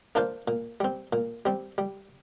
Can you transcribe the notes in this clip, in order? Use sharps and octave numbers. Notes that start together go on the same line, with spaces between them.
A#3 D4 F4 C5
A#2
G3 C4
A#2
G3 C4
G3